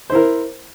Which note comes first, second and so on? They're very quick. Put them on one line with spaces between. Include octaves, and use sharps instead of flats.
C5 E4 A#4